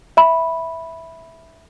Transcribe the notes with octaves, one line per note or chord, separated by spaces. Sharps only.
E5 B5